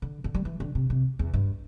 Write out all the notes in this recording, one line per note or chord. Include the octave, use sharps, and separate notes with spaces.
D3
D3
G3
E3
D3
C3
C3
E2
G2